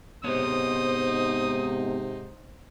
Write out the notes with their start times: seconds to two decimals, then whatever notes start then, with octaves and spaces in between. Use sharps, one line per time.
0.24 G#2 C3 B3 D#4 C5 C#5 D#6